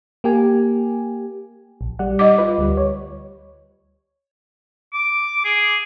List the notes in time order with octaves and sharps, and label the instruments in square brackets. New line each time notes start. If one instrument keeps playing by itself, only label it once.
[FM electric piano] A#3 G4 G#5
A#1
G3 D5 F#5
[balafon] D#5 D6
[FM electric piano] F4 B4
D2 G3
C#5
[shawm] D6
G#4